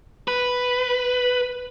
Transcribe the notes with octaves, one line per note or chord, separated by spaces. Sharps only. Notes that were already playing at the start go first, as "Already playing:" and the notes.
B4